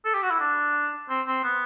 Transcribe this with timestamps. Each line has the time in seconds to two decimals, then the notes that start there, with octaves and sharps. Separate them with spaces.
0.05 A4
0.14 G4
0.23 F#4
0.31 E4
0.40 D4
1.09 C4
1.27 C4
1.44 B3